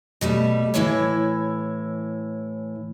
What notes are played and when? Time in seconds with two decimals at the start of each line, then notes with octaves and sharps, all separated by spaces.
0.21 B2 G3 A3
0.74 A2 E3 E4 A4 C#5